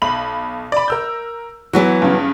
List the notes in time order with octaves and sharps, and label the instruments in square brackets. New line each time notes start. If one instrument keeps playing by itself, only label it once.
[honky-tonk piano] B1 B5 F#7
D5 B5
A#4 E6 G6
[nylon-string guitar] E3 F#3 B3 [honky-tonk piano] F#4
[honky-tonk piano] G2 C#3